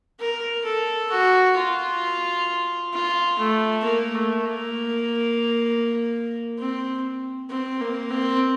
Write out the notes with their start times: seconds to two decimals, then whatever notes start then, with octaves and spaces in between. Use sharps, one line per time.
0.20 A#4
0.65 A4
1.10 F#4
1.56 F4
2.93 F4
3.39 A3
3.84 A#3
4.15 A3
4.45 A#3
6.59 C4
7.50 C4
7.81 A#3
8.10 C4